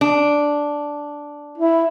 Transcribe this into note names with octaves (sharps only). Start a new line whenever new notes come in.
D4
E4